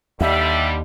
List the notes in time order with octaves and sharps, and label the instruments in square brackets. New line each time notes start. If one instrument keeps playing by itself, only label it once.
[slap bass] D#2 [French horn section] D3 G3 [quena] E5